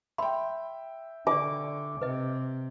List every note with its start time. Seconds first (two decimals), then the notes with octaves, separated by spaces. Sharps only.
0.18 E5 G5 B5 C6
1.27 D3 F4 D5 D6
2.02 C3 B4 D#5